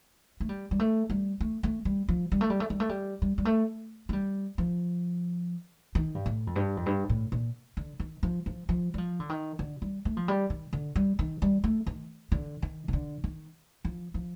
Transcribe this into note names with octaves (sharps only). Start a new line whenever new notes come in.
A3
G3
G3
A3
G3
A3
A3
G3
F3
G3
A3
G3
A3
G3
A3
G3
G3
G3
A3
A3
G3
F3
D#3
G2
A2
F2
G2
F2
G2
A2
A#2
D3
D#3
F3
F3
F3
G3
F3
D3
D#3
D3
G3
A3
F3
G3
D#3
D3
G3
D#3
G3
A3
D#3
D3
D#3
C3
D3
D#3
F3
F3